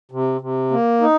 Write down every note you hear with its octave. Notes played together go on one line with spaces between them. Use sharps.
C3
C3
A#3
D#4